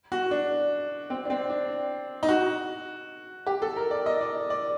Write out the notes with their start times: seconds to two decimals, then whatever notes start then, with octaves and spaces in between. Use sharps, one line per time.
0.12 F#4
0.31 D4
1.10 C4
1.25 D4
1.30 C4
1.50 D4
2.23 D#4
2.29 F#4
3.47 G4
3.62 A4
3.76 A#4
3.91 D5
4.06 D#5
4.21 D5
4.50 D5